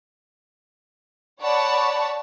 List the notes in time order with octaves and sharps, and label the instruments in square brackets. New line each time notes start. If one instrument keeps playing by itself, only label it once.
[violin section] C#5 D5 F#5 A5 B5 C#6